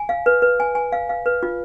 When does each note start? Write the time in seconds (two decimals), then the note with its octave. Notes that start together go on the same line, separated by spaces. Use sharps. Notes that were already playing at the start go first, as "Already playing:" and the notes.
Already playing: G#5
0.09 F5
0.26 B4
0.42 B4
0.60 G#5
0.75 G#5
0.92 F5
1.09 F5
1.26 B4
1.43 F4